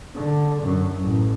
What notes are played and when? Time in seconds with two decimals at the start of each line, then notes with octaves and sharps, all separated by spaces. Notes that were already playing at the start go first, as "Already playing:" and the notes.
0.15 D3
0.63 F#2
1.04 A1